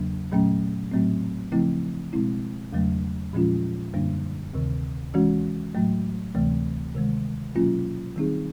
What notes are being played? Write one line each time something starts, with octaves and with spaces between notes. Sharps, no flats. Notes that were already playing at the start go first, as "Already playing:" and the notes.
Already playing: E2 C#3 F#3 A#3 D4
A#2 F#3 A3 C#4
A2 F#3 A3 C4
C#3 F3 A3 C4 E4
B2 G#3 C4 E4
E2 C#3 F#3 A3
A#2 F3 G#3 C#4 F4
F#2 D3 G3 A#3 D4
D2 C3 D#3
E3 G#3 C#4 F#4
A2 F#3 A3
D2 C3 E3 A3
C3 D#3 G#3
B2 F#3 A#3 C#4 F4
D#3 G3 C4 D#4 G#4